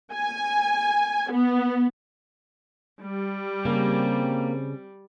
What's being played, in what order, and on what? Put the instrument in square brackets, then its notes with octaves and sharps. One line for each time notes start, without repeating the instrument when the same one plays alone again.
[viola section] G#5
B3
[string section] G3
[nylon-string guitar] C#3 [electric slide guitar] A#3 [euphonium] C4